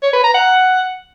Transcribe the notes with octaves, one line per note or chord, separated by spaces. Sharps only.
C#5
B4
A#5
F#5